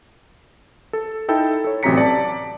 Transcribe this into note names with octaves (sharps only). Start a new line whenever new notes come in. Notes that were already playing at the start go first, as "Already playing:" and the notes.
A4
D#4 E4 A4 G5
A4 C#5
A1 C3 F#3 A#5 B6 C#7
D5 A5